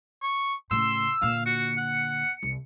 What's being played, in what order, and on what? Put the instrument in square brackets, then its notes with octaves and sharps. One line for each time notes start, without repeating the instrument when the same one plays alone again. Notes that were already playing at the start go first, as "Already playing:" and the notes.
[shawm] C#6
[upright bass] A2 C#3 [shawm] C6 [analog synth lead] E6
[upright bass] A#2 D3 [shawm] F5
[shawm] F#4 [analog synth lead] C#7
[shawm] F#5
[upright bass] C2